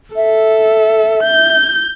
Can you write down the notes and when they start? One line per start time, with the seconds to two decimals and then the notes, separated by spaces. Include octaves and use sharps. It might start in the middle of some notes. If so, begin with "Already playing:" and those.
0.16 A4 E5
1.23 G6